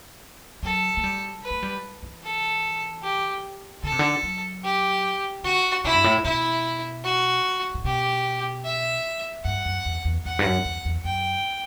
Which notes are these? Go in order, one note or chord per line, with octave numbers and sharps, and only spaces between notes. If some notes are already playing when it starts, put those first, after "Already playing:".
F#3 A4
A3
G3
B4
A3
G3
E3
A4
G4
D3 A4
C3
D3
F#3
G4
D3 F#4
B2 E4
G2
A2
B2 E4
F#4
A2
B2 G4
E5
G2 F#5
F#2
E2
E2
E2 F#5
G2
F#2
E2
E2
F#2 G5